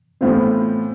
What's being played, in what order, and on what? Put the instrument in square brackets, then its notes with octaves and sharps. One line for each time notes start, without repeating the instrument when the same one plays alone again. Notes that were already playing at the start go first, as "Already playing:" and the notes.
[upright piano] A2 E3 B3 F4 C5 [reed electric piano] C4